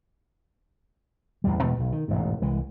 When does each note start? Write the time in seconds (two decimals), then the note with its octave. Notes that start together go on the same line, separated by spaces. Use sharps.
1.44 A1 E2 G3
1.61 E2 B2 G#3 A3
1.79 B1
1.92 D#3
2.08 E1 A1 G#2
2.42 C2 E3 G#3